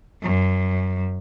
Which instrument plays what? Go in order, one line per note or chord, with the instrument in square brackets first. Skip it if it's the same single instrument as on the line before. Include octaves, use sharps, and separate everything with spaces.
[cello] F#2